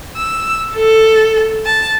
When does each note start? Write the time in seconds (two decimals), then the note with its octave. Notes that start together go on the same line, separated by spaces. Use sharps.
0.18 E6
0.75 A4
1.65 A5